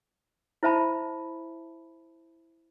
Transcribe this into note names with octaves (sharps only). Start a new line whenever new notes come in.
E4 C5 E5 A5 B5